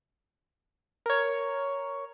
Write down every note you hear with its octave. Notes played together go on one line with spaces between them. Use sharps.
A#4 C#5